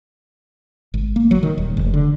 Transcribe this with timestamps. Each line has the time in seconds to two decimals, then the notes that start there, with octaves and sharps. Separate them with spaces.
0.94 G#1
1.16 A#3
1.31 F#3
1.43 D#3
1.58 D#1
1.77 F1
1.94 D3